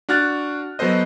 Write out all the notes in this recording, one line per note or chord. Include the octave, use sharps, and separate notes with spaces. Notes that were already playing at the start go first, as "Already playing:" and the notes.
D4 F#4 F6 F#6 A6
F#3 B3 A4 C5 D#5